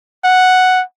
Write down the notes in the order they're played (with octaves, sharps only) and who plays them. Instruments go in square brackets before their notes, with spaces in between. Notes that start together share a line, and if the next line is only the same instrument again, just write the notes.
[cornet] F#5